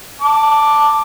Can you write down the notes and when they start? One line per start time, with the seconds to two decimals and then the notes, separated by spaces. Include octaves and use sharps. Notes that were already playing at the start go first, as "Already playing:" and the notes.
0.22 A5 D6